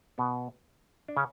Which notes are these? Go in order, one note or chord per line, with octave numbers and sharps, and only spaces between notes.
B2 B3
D4
C#3 C#4